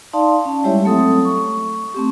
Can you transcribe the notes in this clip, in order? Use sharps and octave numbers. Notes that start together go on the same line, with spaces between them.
D#4 D5 F5 A5 C6
C#4 A5
G3 G#3 E4 G4 C#5 E5
F#3 A3 C4 A4 D#6
C#6
A3 C4 G4